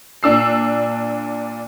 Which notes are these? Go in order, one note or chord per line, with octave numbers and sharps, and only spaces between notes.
A#2 D4 E6 C7